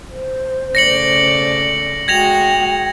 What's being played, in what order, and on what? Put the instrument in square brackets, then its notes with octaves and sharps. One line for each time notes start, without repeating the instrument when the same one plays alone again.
[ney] C5
[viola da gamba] C#3 A3 D5 [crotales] A#6 C#7 F#7
[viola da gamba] G#3 F#4 [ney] G5 [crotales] G#6 A#6 F7